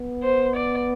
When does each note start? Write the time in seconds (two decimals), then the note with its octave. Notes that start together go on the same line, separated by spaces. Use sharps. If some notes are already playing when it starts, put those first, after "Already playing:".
Already playing: B3
0.23 C5
0.56 D5